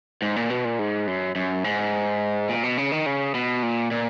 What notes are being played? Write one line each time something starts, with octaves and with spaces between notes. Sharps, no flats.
G#2
A#2
B2
A#2
G#2
F#2
F#2
G#2
A#2
B2
C#3
D#3
C#3
B2
A#2
A#2